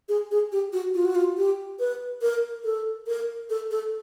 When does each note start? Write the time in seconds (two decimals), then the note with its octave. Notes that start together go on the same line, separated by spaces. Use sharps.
0.09 G#4
0.31 G#4
0.52 G4
0.73 F#4
0.95 F4
1.05 F#4
1.15 F4
1.37 G4
1.80 B4
2.22 A#4
2.64 A4
3.07 A#4
3.50 A4
3.71 A4